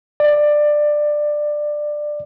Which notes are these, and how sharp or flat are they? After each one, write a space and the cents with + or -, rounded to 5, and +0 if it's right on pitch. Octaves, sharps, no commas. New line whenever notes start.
D5 +15